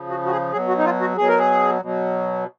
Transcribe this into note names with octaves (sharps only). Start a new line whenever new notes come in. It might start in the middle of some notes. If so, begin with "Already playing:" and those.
Already playing: C#3 F3
F#4
F#4
G#4
B2 F#3 G#4
F#4
D#4
F4
F#4
B2 F#3 G#4
A#4
G#4
B2 F#3